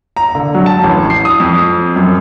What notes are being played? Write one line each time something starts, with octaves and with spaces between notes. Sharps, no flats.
A#5
D3
F#3
A5
A1
C7
D#6
F2
F#2